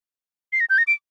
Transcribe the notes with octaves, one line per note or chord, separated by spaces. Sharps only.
C7
A#6
G6
A#6
D7